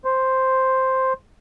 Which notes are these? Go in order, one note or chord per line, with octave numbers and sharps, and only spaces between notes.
C5